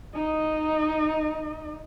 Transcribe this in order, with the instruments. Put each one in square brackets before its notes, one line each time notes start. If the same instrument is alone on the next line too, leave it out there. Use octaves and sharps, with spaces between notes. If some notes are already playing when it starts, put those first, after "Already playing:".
[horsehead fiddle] D#4 D#5